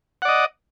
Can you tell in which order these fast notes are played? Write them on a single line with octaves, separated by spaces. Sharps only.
F#5 D5 D#5